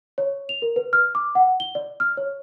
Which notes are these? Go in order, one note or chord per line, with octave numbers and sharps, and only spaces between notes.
C#5
F7
A#4
B4
F6
D6
F#5
G7
D5
F6
C#5